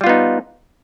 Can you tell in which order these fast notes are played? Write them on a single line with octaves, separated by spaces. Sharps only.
G3 F4 B3 D#4